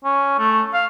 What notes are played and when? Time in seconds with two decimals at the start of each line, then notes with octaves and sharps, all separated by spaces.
0.05 C#4
0.39 A3
0.74 F5